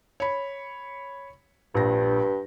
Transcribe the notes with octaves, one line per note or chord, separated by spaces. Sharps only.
C#5 B5
A#1 G2 A#6